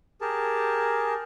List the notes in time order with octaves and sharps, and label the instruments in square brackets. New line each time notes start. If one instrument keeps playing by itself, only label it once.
[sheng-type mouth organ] G4 G#4 A#4 A5